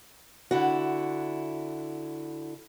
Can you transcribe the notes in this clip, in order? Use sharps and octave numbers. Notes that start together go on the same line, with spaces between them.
D3 E4 F#4